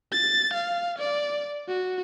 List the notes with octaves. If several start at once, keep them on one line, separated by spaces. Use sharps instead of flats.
A6
F5
D5
F#4